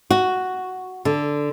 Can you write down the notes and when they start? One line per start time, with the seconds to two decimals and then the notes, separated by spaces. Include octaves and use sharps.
0.10 F#4
1.05 D3